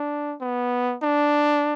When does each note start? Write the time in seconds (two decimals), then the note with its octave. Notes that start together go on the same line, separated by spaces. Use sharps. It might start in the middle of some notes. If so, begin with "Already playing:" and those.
Already playing: D4
0.41 B3
1.03 D4